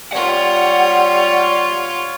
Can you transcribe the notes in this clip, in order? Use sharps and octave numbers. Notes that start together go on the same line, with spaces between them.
G3 F4 C#5 F#5